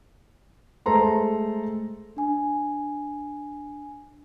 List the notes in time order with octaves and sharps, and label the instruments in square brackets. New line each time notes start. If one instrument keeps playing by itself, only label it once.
[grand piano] G#3 A3 A4 C5 A#5 C6
[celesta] D4 G#5